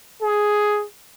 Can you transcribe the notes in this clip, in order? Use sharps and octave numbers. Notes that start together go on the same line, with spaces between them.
G#4